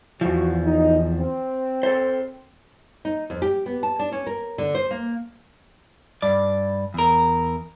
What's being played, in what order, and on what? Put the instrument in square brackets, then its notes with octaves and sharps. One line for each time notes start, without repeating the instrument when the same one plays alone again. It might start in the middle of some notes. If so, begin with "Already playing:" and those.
[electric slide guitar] E2 F3 [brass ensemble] F#4
[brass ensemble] B1 C3 D#4
C4
[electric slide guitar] A4 C5
[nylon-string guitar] D#4
F2
G4
B3
A5
D4
C#4
A#4
D3
C5
A#3
[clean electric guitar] G2 D5
E2 A#4